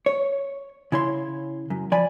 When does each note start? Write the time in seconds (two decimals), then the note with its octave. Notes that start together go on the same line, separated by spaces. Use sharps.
0.06 C#5
0.92 C#3 E4 C#5 C6
1.70 F#2
1.92 F3 D5 G#5 B5